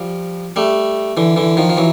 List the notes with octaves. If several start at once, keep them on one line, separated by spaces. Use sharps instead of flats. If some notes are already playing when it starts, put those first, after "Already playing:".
Already playing: F3 G3
G3 A3
D3 E3
D3 E3
D#3 F3
F3
E3 F#3